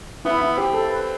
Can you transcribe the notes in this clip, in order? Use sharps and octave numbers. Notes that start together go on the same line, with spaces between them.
B3 E4
E4
C4 G4
A4
B4